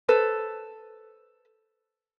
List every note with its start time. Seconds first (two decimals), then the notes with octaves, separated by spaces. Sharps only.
0.08 A4 B4 C5